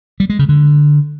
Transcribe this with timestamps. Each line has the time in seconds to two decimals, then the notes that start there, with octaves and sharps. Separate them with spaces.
0.20 G3
0.30 G#3
0.39 C#3
0.49 D3